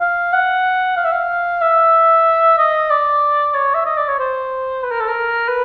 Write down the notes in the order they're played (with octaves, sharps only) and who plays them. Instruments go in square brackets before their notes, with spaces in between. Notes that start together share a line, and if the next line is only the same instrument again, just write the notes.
[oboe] F5
F#5
F5
E5
F5
E5
D#5
D5
C#5
E5
D#5
D5
C#5
C5
B4
A#4
A4
A#4
B4